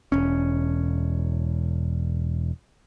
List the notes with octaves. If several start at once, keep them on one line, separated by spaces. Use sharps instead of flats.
E1 C#4